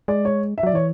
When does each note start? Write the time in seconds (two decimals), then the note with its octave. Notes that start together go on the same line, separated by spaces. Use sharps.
0.08 G#3 D5
0.25 C#5
0.58 E5
0.63 F#3 D5
0.74 E3 C#5